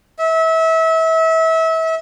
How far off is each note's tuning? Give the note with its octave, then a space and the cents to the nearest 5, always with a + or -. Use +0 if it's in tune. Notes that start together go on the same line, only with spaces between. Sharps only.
E5 -30